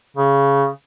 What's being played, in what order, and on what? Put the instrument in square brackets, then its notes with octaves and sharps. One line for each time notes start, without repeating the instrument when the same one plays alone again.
[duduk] C#3